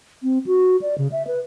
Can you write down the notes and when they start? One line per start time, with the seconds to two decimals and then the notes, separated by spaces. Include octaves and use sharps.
0.23 C4
0.46 F#4
0.82 D5
0.98 C#3
1.12 E5
1.27 B4